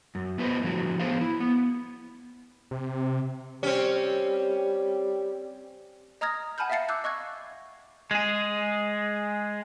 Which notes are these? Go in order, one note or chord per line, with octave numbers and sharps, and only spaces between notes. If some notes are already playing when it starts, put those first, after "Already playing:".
F#2
B3 F4 B4 C5 D#5
A2 D3 F3 F#4
F3 B3 C#4 G#4 C5 F5
E4
B3
C3
G3 C4 C#4
D#5 A#5 D#6 F6 G#6 A#6
F#5 G#5 A5 B5 F6 G6
E5 F5 A5 A6 C7 C#7
D6 E6 F#6 G6
D#5 C#6 F#6 G#6
G#3 G#4